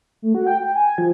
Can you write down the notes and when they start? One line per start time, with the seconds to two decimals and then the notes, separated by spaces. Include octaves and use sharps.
0.22 A3
0.35 F#4
0.47 G5
0.63 G5
0.75 G#5
0.98 F3